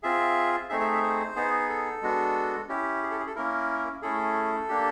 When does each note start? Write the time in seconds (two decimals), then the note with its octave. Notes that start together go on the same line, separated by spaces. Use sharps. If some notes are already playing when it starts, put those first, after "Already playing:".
0.03 C4 F4 G#4 E5
0.69 A3 C4 D#4 G#4 E5
0.80 E5
0.92 E5
1.03 C5
1.36 B3 D#4 G#4
1.69 A4
2.02 G#3 B3 D4 F#4
2.69 C#4 E4 G4
3.03 G#4
3.11 A4
3.19 G#4
3.27 A4
3.35 A#3 C#4 E4 A#4
4.02 A3 C#4 E4 G#4 A4
4.68 A#3 D4 G4